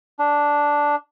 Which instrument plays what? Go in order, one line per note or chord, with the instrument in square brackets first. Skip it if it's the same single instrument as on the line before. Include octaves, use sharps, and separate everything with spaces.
[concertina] D4